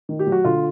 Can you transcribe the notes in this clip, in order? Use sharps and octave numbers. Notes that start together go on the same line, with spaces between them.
D#3
G4
F#3
F#4
D3 F4